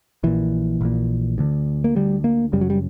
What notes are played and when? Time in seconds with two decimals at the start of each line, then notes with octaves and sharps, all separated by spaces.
0.23 A#1 A#2 E3
0.81 A#1 A#2
1.38 D2 D3
1.84 A#3
1.96 D2 D3 G3
2.24 A#3
2.52 F#1 F#2 C#3 G3
2.61 F#3
2.70 G3